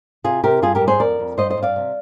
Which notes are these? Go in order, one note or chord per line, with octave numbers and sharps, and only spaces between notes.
C3 F4 G#4
C3 G4 A#4
G2 F4 G#4
G4 A#4
G2
G#4 C5
F2 A#4 D5
F2
G2 C5 D#5
C5 D#5
G2
D5 F5
C3